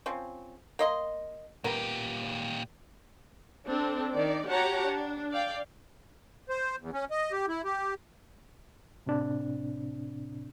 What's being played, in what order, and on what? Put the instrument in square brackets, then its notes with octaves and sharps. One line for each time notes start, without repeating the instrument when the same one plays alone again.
[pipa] F3 C4 C#4
A#3 D#5 C6
[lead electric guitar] A#2 G4 [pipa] B3 A#4
[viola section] C4 D4 A4
D#3 D5
F#4 G4 C#5 F#5 A5 A#5
D4
D5 F5 G5
[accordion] C5
E2
C#4
D#5
G4
E4
G4
[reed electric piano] A2 C3 C4 D4